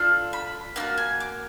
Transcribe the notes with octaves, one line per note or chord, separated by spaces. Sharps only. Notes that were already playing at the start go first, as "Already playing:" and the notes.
Already playing: D4 F4 A4
B5
A#3 D#4 F#4 A5
G#5
D6